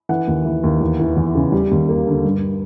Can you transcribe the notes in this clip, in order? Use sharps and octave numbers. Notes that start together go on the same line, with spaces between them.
E3 F#5
D#2
E3
D#2
E2
E3
E2
C#3
G3
D#2
A#3
D3
G2